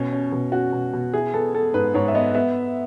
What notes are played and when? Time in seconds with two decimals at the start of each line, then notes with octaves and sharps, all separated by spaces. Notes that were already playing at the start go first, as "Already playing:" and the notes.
Already playing: B2 C#4
0.13 C#4
0.32 B2
0.52 C#4 F#4
0.73 B2
0.93 B2
1.13 E4 G#4
1.34 B3 A4
1.54 B3 A4
1.74 G#2 B4
1.94 G#2 C#5
2.08 E5
2.14 B3 D#5
2.34 B3 E5